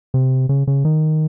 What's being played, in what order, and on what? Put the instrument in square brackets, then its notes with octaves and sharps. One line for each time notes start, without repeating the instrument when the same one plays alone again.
[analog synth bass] C3
C#3
C#3
D#3